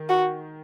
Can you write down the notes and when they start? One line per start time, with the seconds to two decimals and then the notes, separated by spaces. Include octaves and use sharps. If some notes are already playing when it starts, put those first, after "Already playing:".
Already playing: D#3
0.09 F#4